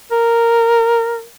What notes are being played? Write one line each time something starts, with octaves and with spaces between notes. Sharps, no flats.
A#4